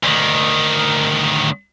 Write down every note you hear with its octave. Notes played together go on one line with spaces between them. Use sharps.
D2 D#3